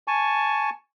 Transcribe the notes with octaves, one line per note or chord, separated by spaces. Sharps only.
G#5 A5 C#6